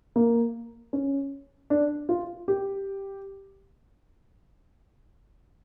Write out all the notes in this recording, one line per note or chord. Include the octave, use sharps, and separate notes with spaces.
A#3
C#4
D4
F4
G4